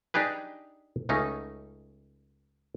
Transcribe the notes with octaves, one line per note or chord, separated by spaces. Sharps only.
D4 D#4 G4 G#4 B4
C#2 A3 C#4 D#4